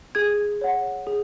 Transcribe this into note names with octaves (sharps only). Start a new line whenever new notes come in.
G#4 G#6
C#5 F#5
G#4